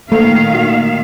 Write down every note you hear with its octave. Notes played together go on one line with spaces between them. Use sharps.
A#2 D#3 A3 F5
F#4